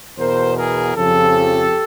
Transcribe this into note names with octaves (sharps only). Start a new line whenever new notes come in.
E2 B2 A#4 C5
G#4 A#4
F2 C#3 F3 G4 A4